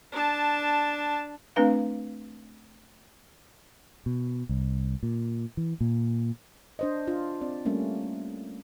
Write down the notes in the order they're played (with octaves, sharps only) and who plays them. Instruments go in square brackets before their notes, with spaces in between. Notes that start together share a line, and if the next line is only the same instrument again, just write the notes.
[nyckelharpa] D4 A5
[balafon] A3 C4 D4 B4 F5
[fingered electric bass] B2
C2
A#2
E3
A#2
[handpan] D4 C5 D#5
D4 F4
C4 D5
G3 A3 A#3 C#4